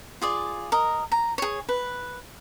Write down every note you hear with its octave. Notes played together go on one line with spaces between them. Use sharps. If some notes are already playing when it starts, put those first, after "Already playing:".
F4 G#4 D5
A#4 D#5
A#5
G#4 C#5
B4